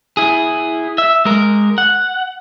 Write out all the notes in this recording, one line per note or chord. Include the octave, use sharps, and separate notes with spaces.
E4 G#4
E5
G#3 A#4
F#5